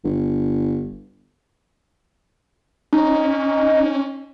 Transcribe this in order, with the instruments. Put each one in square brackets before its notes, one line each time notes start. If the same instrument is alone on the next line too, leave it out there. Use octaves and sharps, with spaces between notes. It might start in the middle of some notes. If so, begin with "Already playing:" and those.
[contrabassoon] G1
[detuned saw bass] C#4 [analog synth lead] D#4